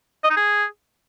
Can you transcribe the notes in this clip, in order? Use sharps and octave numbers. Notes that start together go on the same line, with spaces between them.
D#5
D#4
G#4